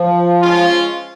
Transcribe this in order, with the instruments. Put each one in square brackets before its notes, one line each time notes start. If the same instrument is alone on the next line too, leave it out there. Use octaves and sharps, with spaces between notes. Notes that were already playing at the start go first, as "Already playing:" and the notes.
Already playing: [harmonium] F3
[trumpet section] G#3 C#4 F4